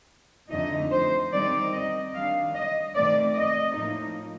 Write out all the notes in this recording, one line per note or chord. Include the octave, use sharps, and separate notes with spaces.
F2 D3 A3 D#4 D#5
C5
D#3 G3 C4 D#4 D5
D#5
D#3 G3 D4 F5
D#5
D#3 A3 C4 D5
D#5
A2 F3 A#3 D#4